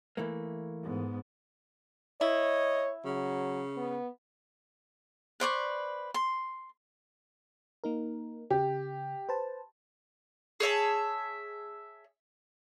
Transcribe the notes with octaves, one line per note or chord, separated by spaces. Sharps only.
E3 A3 A#3
G#2 B3
E4 C#5 D#5
C#3 F#3
B3
B4 C5 D5 C#6
C6
A#3 D#4 A#4
C#3 G4
B4 C5 A5
G#4 C#5 E5 A5